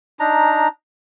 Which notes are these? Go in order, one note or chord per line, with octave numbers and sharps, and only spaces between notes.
D4 D#4 A#5